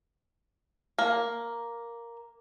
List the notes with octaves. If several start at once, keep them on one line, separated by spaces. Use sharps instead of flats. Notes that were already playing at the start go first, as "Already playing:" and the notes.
A#3